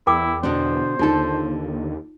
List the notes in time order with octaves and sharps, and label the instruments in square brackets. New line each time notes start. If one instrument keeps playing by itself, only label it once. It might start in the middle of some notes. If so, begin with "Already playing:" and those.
[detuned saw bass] E2 [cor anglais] E4 [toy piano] A#4 G5 D6
[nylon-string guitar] B2 D3 D4 [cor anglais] C5
[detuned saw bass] D#2 [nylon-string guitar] D3 A4 [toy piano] D#4 F4